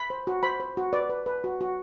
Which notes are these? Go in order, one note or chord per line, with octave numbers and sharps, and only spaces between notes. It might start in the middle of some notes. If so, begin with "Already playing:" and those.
Already playing: B5
C5
F#4
C5 B5
C5
F#4
B4 D5
B4
B4
F#4
F#4